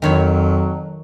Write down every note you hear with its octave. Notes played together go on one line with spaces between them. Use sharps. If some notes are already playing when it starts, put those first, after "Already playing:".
F2 D#3 F#3 C#5 B5